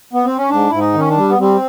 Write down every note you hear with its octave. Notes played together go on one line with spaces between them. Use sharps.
B3
C4
C#4
G#2 D4
G#2 E4
D#4
D#3 C#4
D4
G3
B3
G3 C4